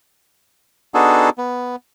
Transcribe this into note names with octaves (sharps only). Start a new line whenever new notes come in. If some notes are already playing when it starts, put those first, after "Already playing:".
B3 D4 D#4 F#4 G#4 A4
B3